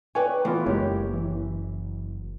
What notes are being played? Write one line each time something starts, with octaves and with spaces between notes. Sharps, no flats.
B4 C#5 D5 G5 G#5
E3 A3 B3 F4
F#1 G#3 A#3 G4 C#5
E3